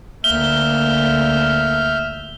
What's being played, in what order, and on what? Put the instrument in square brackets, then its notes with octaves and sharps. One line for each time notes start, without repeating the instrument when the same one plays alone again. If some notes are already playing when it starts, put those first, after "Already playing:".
[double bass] D2 A#3 [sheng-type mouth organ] E5 F6 G6 [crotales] G7